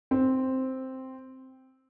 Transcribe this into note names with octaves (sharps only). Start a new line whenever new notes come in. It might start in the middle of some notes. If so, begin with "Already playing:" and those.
C4